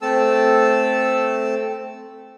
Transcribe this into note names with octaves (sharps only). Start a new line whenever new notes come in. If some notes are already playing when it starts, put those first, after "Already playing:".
A3 C4 A4 A5 E6